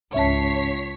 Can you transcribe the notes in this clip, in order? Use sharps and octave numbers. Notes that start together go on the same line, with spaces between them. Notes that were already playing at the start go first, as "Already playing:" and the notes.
C#2 G#2 C#4 C#5 E5 A5 B6 C7